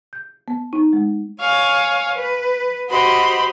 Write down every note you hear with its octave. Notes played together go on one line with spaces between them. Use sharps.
G6
B3
D#4
G#3
C#5 F5 G#5 C#6
B4
F#4 G4 C5 D#5 B5 C6